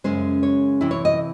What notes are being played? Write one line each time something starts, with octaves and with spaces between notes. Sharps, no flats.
F#2 C#3 G#3 C#4 C5
C#5
C3 E3 C4 E4
C#5
D#5